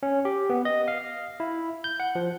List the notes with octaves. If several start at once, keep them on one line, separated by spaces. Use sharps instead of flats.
C#4
G4
B3
D#5
F5
E4
G6
F#5
F3